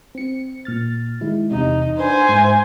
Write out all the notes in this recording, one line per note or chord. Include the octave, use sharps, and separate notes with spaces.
C4 C#7
A#2 F6 A6
D#3 G#3 E4
E2 C3 D#4
D4 B4 C5 G#5
G#2 E5